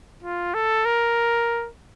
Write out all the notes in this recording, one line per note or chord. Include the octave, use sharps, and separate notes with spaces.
F4
A4
A#4